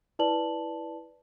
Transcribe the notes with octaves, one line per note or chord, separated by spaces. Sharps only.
E4 B4 D5 A5 F#7